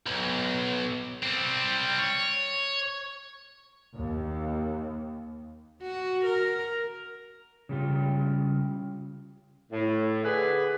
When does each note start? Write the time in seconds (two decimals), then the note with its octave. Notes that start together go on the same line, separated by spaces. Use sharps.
0.06 B1
1.23 G3 C4
1.99 C#5
3.94 D#2
5.82 F#4
6.25 A#4
7.69 C#3 G3 F4
9.71 A2
10.24 D3 G#4 B4